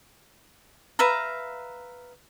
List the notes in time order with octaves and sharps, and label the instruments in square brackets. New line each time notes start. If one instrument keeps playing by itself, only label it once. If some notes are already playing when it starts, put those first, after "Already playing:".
[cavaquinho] B4 E5 F5 A#5